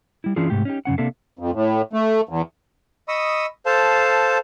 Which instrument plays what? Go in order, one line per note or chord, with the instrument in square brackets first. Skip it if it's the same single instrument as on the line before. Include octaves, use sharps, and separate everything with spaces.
[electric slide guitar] G3 E4
E3 C#4 D4 E4 F4 G#4
G#2 C3 A3 G4
C#4 D#4 G4
F#2 C#3 C#4 F#5
C3 A#3 D4 A4 E5 F5
[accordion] F2
A2
A3
E2
[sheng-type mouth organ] D#5 B5 C#6 D#6 E6
A4 C5 F5 A5